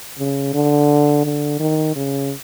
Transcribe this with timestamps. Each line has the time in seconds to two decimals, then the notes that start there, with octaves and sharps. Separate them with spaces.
0.19 C#3
0.54 D3
1.25 D3
1.60 D#3
1.96 C#3